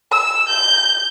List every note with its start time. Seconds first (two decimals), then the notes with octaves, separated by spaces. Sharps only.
0.12 E6
0.49 G6